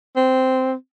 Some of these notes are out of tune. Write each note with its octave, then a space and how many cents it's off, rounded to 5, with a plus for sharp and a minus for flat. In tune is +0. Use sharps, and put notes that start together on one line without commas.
C4 -10